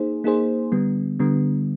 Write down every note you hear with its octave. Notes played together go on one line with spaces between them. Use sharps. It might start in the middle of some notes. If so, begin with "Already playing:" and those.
Already playing: A#3 D#4 G#4 C5
A#3 D#4 G#4 C5
D3 G3 B3
D3 G3 B3